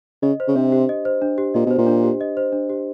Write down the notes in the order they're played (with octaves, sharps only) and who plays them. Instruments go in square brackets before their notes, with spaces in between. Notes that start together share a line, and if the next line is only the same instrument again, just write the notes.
[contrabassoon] C#3 [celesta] D#5
[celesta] C5
[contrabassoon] C#3
[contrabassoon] C3 [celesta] D4
[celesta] G4
D#5
C5
D4
G4
[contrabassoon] A#2 [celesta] D#5
[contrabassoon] B2 [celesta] C5
[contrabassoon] A#2
[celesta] D4
G4
D#5
C5
D4
G4